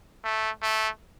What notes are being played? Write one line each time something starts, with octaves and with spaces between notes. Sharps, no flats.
A3
A3